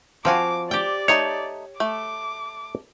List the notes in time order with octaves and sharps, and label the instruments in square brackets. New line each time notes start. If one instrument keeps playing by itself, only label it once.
[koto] F3 F#4 [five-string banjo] C4 F5 G#5 [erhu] D6
[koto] G4 G5 [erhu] D5
[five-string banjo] A3 D#4 A5 [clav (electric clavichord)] C#5
[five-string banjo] A3 [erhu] D6